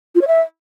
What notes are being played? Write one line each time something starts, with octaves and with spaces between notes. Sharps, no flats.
F4
C#5
E5